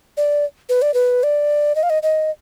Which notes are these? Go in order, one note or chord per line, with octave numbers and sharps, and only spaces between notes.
D5
B4
D5
B4
D5
D#5
F5
D#5
D#5